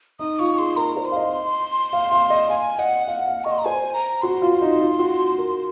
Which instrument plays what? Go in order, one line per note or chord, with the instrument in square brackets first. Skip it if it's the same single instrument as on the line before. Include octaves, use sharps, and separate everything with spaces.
[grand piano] D#4 [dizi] D#6
[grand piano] F4 [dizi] C#6
[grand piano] G#4 [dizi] C6
[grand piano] A#4 [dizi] A#5
[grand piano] C5
[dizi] C6
[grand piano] F5
D#5
F5
F5
D#5
[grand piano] F5 [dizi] G#5
[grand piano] D#5 [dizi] F#5
[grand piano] F5 [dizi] F#5
[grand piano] F5
[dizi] F#5
[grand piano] D#5 [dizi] C#6
[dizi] C6
A#5
[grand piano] C5 [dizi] G#5
[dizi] A#5
[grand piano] F#4 [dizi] C6
[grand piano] F4
[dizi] C6
[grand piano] D#4
F4
F#4
A#4